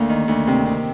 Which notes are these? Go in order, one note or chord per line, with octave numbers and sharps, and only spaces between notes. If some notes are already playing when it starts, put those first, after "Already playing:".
Already playing: D2 A#3 F5
D#3
D2
C3
C3